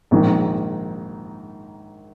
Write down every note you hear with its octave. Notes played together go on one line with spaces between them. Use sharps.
A#1 G#2 D#3